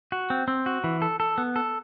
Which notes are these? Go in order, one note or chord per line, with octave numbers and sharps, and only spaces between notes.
F#4
C4
C4
F#4
E3
A4
A4
B3
A4